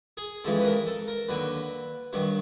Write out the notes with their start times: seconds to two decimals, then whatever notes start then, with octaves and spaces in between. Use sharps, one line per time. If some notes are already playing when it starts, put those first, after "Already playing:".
0.17 G#4
0.44 F2 C#3 E3 G#3 A4
0.59 B4
0.66 A#4
0.87 A4
1.08 A#4
1.29 D#2 D3 F#3 B4
2.13 G2 D#3 F#3